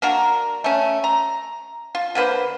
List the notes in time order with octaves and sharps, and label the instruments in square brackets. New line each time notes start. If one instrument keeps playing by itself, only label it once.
[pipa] A#3 D4 F#4 A#4
A3 C#4
A#5
F4
D3 A#3 B4 C5